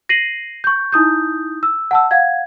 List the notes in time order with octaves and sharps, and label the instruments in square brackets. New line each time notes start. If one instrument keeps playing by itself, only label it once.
[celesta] A#6 C7 D#7 F#7
C#6 G6
D#4 E4 D#6 G6
E6
F#5 A5 E6
F5 F#5 G#6